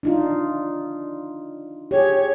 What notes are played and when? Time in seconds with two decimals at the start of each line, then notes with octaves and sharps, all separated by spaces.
0.03 D4 D#4 F4
1.91 G4 G#4 C#5